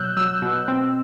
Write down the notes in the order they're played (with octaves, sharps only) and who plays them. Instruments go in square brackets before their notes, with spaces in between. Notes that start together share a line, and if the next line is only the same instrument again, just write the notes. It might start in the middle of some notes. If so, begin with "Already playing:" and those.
Already playing: [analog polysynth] B2 F#3 E6 F#6 G6
F#3 E6
B2
C4